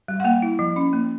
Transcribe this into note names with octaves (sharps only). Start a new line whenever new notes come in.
G3
F#5
A#3 G5
E4
F3
C#4
A#3